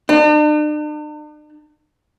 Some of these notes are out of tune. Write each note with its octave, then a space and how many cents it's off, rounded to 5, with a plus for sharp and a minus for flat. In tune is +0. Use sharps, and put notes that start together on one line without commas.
D4 +45